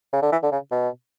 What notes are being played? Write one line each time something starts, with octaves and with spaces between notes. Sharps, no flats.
C#3
D3
E3
D3
C#3
B2